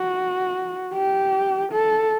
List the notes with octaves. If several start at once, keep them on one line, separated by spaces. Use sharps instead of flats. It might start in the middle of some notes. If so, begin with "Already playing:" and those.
Already playing: F#4
G4
A4